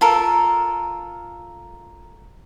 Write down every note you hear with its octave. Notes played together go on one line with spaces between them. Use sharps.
F4 A4 A#4